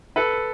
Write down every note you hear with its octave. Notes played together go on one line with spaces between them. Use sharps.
A4 B4